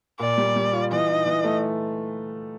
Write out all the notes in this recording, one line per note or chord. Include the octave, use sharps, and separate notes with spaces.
A#2 D5
G3
G3
F4
E3 D#5
D#4
E3
A3